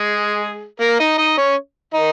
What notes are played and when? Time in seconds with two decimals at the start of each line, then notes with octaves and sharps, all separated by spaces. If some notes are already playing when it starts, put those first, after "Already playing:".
Already playing: G#3 G#4
0.80 A#3 A#4
0.99 D#4 D#5
1.18 D#4 D#5
1.38 C#4 C#5
1.94 D#3 D#4